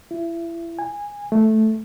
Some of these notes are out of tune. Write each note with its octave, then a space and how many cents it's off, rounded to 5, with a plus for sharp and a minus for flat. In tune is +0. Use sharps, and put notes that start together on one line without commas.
E4 +30
G#5 -15
A3 -5